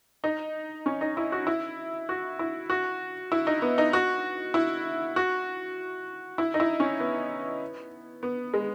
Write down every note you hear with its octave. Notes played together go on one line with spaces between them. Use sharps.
D#4
C#4
D#4
E4
F#4
E4
F#4
E4
F#4
E4
D#4
B3
D#4
F#4
E4
F#4
E4
D#4
E4
C#4
B3
B3
G#3